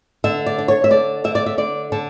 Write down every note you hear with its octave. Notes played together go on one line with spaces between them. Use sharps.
D3 E5
D5
D4
C#5
E5
D3 D5
D3 E5
D5
E5
D3 D5
D3 A4